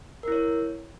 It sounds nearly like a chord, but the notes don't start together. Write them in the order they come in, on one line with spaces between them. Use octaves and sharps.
A#4 E4 C#5